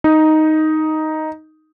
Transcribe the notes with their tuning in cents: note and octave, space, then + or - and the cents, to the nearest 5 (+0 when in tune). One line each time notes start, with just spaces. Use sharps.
D#4 +5